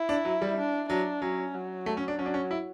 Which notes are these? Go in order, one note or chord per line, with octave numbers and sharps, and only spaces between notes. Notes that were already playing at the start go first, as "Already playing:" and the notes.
Already playing: E4
D4
F#3
G3
D4
F#3 D4
F#3 C#4
F#3
A3
C#4
D4
F#3 C#4
D4
C#4
E4